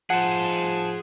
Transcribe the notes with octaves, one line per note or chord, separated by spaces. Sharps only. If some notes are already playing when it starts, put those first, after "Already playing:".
F3 G#4 C5 F#5 A5